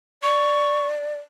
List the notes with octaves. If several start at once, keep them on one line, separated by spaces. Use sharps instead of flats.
D5 C#6